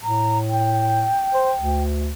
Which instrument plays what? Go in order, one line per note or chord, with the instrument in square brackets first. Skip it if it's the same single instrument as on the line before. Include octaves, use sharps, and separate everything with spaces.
[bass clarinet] A2 [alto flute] A#5
[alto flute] G5
[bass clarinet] C5
D2